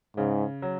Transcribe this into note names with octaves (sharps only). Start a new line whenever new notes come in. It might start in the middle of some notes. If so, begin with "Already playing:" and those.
G#2 C#3
F#3